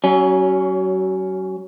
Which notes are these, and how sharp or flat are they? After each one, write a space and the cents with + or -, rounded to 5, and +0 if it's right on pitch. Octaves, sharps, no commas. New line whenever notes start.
F#3 +30 C#4 +5